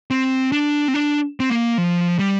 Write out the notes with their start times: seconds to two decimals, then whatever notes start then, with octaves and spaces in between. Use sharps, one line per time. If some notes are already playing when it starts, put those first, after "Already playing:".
0.11 C4
0.52 D4
0.88 C4
0.94 D4
1.40 C4
1.50 A#3
1.78 F3
2.19 G3